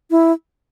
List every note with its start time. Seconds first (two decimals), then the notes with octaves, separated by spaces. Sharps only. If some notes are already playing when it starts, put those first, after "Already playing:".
0.11 E4